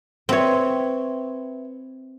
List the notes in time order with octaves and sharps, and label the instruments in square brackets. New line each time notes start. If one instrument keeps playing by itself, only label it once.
[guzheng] C4 C#5 [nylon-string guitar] B4 E5 G5